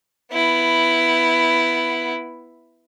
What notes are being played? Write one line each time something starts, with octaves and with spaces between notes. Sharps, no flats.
B3 E4